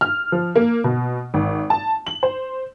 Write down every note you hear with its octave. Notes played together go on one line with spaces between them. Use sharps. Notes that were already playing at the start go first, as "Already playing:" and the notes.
F6
F3
A#3
B2
G#1
A5
F#7
C5